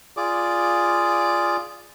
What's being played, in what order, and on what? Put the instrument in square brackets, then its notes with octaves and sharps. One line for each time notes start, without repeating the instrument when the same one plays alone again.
[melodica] F4 G#4 D5 D6